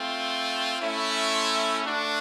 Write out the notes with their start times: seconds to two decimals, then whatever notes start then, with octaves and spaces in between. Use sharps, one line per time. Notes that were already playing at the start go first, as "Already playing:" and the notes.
Already playing: A3 C4 F4
0.81 A3 C#4 E4
1.32 C6
1.83 A3 D4 F#4